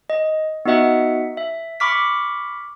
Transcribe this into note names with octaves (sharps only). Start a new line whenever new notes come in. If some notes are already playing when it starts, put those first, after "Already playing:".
D#5
B3 D#4 F#4 D#5 E5 F#5
E5
B5 C#6 D6 F6 B6